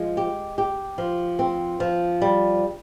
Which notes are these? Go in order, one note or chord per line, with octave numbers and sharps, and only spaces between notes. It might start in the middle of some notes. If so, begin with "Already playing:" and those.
Already playing: F3 G#3
G4
G4
F3
C4
F3
G3